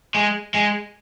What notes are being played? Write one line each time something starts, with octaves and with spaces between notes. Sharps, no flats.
G#3
G#3